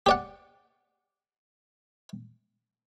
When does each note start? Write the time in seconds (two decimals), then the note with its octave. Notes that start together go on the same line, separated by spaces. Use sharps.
0.06 G4 D5 F#5